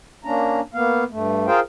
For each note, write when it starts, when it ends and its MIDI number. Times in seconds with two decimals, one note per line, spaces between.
0.25 0.60 58
0.25 0.60 61
0.25 0.60 62
0.25 0.60 82
0.74 1.04 58
0.74 1.04 59
0.74 1.04 77
1.11 1.46 43
1.11 1.46 57
1.47 1.60 65
1.47 1.60 68
1.47 1.60 70
1.47 1.60 72
1.47 1.60 77
1.47 1.60 79